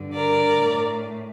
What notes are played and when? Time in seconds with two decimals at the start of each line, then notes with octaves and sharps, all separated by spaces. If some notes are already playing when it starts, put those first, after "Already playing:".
Already playing: G2 D3
0.13 A#4 D5
0.59 A2